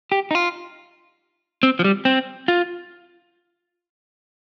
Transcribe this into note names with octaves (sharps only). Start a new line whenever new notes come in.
G4
D#4
F4
C4
F3
G3
C4
F4